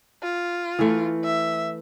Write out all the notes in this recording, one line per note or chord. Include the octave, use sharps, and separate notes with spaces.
F4
E3 A3
E5